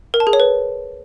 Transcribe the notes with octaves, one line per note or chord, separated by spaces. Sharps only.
A#4
A5
G#4
C#5
B4